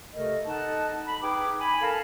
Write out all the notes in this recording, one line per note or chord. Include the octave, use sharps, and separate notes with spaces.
C3 A3 A4 A#4 D#5
D#4 A4 D#5 F#5 A5
B5
D#4 G#4 B4 G5 D6
G#5 B5
A4 A#4 F5 G#5 A5